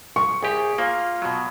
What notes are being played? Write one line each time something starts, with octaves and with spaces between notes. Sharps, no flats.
C#6
C2 G4 G#4
A#3 F4
B2 F#3